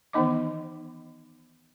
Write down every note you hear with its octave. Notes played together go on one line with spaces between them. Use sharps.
D#3 E3 B3 D#4 D#5 D6